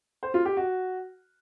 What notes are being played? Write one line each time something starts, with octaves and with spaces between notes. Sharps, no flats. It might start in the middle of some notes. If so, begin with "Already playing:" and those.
C5
F4
G4
F#4